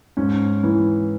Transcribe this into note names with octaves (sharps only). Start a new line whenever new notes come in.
G#2 C#4
E3